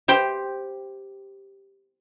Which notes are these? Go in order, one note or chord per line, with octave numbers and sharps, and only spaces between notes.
G4 C5 G5